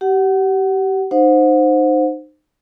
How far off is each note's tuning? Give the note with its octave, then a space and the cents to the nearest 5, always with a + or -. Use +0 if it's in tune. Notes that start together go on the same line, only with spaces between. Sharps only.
G4 -25 F#5 +15
D#4 -25 C5 +0 F#5 -35